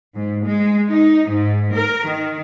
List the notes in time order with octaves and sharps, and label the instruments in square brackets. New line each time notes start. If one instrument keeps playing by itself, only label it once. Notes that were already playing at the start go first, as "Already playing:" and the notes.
[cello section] G#2
G#3
D#4
G#2
A#4
D#3